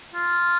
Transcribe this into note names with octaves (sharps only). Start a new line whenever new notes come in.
F4